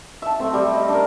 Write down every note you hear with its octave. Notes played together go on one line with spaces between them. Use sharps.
E5 A5
A3 C4
G3
D#5
D4 A#4